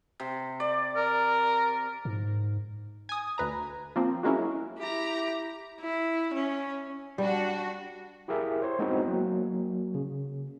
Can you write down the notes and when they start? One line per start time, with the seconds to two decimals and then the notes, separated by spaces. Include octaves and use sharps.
0.20 C3
0.60 D5
0.96 A#4
2.05 G#2
3.09 G#5 D#6
3.38 D2 B4 A#5
3.96 F3 A#3 C4
4.23 F#3 G#3 A#3 C#4 E4
4.79 E4 G4 A#5
5.81 E4
6.34 C#4
7.18 G3 D4 F#4
8.28 E4 G4 G#4 A#4 E5 F5
8.62 C5 C#5 C6
8.79 G#3 B3 C4 D#4 E4 F#4
9.08 F#3 A#3
9.95 C#3